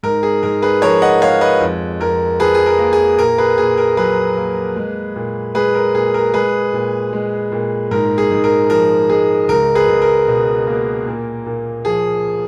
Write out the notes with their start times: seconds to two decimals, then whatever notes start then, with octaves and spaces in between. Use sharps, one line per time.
0.03 G#2 A#4
0.23 G#4
0.43 G#2 A#4
0.62 G#4 B4
0.82 F3 A#4 C#5
1.02 D#5 F#5
1.22 G#3 C#5 F5
1.41 B4 D#5
1.61 F2
2.00 F2 A#4
2.40 F3 G#4 B4
2.55 G#4
2.66 A#4
2.79 A#3
2.93 G#4
3.18 A#2 A#4
3.38 G#4 B4
3.58 A#2 G#4
3.78 A#4
3.97 F#3 G#4 B4
4.37 A#3
4.76 G#3
5.16 A#2
5.55 G#3 G#4 B4
5.75 A#4
5.94 A#2 G#4
6.14 A#4
6.34 G#3 G#4 B4
6.73 A#2
7.13 G#3
7.52 A#2
7.91 G#2 A#4
8.18 G#4
8.31 G#2
8.44 A#4
8.70 F3 A#4
9.09 G#3 G#4
9.49 C#2 A#4
9.75 G#4 B4
9.88 C#2
10.02 A#4
10.28 B2
10.67 A#3
11.07 A#2
11.46 A#2
11.85 F3 G#4